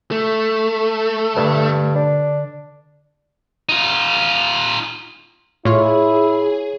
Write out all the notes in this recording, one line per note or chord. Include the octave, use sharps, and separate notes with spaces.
A3
G2 D3
D4
D#4 F4
A2 E4 F4 G#4 C#5